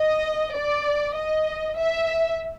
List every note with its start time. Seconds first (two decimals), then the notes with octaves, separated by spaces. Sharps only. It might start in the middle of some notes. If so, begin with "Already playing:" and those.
Already playing: D#5
0.55 D5
1.15 D#5
1.77 E5